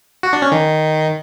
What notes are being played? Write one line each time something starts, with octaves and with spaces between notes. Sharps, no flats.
F#4
D4
C#4
D#3